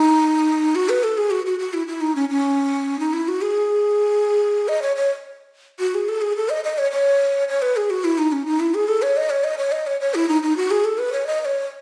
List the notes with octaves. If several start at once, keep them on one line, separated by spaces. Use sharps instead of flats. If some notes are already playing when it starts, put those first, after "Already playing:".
Already playing: D#4
F#4
B4
A4
G#4
F#4
F#4
F#4
E4
E4
D#4
C#4
C#4
D#4
E4
F#4
G#4
D#5
C#5
C#5
F#4
G#4
A4
G#4
A4
D#5
D#5
C#5
C#5
C#5
B4
G#4
F#4
E4
D#4
C#4
D#4
E4
G#4
A4
C#5
D#5
C#5
D#5
C#5
D#5
C#5
C#5
E4
D#4
D#4
F#4
G#4
A4
B4
C#5
D#5
D#5
C#5